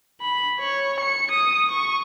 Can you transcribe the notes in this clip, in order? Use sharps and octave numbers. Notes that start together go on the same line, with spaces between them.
B5
C#5
C#7
D#6
C#6